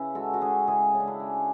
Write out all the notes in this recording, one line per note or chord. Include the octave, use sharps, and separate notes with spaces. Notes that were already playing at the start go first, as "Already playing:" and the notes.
Already playing: C#3 C#4 E4 B4
G#3 F#4 A4
F#4
C#4 E4 G#4
C#3 E4 G#4
C#3
D4
E4
G#3